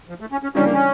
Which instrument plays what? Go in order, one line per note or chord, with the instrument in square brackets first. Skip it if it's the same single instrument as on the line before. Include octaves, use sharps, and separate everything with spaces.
[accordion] F3
A3
C#4
C#4
[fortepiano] C#3 E3 G3 D4 [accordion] C#4
[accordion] A#3
C#4